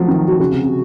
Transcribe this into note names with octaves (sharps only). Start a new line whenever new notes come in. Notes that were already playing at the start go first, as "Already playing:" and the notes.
Already playing: F3 F#3 A3
D#3
F#4
C#3 F#4
C3
C3